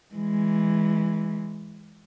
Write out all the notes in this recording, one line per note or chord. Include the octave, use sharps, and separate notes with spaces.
E3 G#3